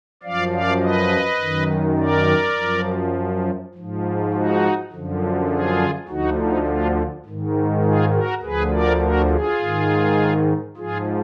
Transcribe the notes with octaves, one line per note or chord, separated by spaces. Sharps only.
F#2 F3 D5 F5
D5 F5
B4 D#5
F#2 D#3
A#4 D5
F#2 F3
G#2 F3
D#4 F#4
F#2 D3 F3
F4 G#4
D2 D3 F3 D#4 F#4
D#4
D4 F4
G#2 D#3
F4 G#4
F#4 A#4
D2 D3 F3 G#4 B4
A#4 D5
F#4 A#4
F4 G#4
G#2 D#3
G#2 F3 F4 G#4